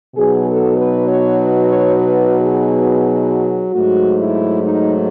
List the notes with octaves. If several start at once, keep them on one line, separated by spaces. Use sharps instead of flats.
B2 F#3 B3 D#4 G#4
A4
B4
C#5
C#5
B4
G#4
G#2 F#3 A3 F#4
E4
D#4